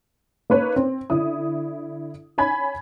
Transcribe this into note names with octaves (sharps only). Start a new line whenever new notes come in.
A#3 D#4 B4 C#5
C4
D3 E4 D#6
C#5 G#5 B5 G#6